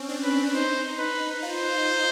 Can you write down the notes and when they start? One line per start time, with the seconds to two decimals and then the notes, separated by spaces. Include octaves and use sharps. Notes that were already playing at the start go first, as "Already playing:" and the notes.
Already playing: C4 C#4
0.09 D4
0.24 B4
0.54 D#4 C5
0.98 B4
1.42 F4 C5